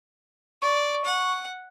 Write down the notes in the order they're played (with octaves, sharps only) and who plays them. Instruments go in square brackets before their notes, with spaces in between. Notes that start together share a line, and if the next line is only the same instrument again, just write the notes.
[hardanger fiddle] D5 [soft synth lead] C#6
[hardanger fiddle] F#5